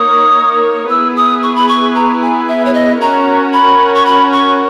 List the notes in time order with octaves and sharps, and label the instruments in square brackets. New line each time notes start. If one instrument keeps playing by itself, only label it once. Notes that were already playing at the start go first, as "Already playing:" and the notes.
Already playing: [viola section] A#3 D#4 A#4 C#5 [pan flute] D#6
[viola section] B3 E4 G#4 B4 [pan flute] E6
[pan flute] D#6
C#6
B5
C#6
A#5
G#5
E5
C#5
D#5
[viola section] C#4 F#4 A#4 C#5 [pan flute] A#5
[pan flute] B5
C#6
B5
C#6